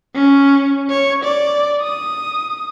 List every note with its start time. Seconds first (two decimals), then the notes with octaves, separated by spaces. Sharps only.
0.15 C#4
0.90 C#5
1.24 D5
1.81 D#6